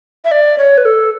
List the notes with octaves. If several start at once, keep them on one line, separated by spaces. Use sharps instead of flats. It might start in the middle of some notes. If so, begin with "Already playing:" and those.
E5
D5
C#5
B4
A4